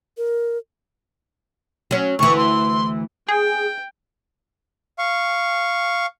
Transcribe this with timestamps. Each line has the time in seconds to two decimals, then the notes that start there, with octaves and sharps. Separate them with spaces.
0.18 A#4
1.91 F#3 C#4
2.19 D2 E3 C#6
2.37 C6
3.28 G#4 G5
4.99 F5 C#6